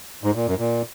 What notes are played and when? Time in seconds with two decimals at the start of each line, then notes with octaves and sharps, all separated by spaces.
0.24 G#2
0.35 A#2
0.47 F#2
0.58 A#2